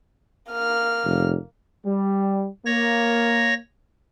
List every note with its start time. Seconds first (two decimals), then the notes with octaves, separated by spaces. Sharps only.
0.52 A#3 F6
1.04 F1
1.85 G3
2.66 A#3 C#5 A#6